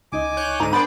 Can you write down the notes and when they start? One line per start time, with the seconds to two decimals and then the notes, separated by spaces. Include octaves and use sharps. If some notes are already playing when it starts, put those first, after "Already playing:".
0.12 C#2 D#4 D#5 G#5 D6
0.37 C#5 F#6 G6
0.60 G#2 D3 A#5 D#7
0.73 B3 D4 G#4 A#4 C5 D5 G5 B5